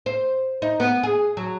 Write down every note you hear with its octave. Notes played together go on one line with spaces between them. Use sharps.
C5
D#4
B3
G#4
F#3